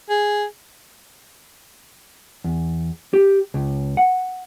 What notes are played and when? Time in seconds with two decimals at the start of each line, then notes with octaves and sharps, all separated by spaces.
0.10 G#4
2.44 E2
3.13 G4
3.54 C#2
3.97 F#5